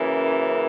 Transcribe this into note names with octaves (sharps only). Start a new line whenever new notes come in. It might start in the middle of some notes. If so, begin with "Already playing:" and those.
Already playing: F#2 C#3 E3 A#3